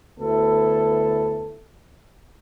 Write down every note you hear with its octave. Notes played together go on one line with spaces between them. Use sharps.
D2 B3 E4 A4